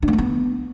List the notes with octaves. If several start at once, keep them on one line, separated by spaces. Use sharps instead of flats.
D4
A#3
A3
B3